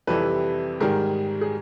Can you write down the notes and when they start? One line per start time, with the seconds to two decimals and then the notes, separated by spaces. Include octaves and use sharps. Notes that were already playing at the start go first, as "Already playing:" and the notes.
0.07 F2 C3 E3 G3 A4 B4
0.80 G#2 D#3 G3 G#4 A#4
1.41 G#4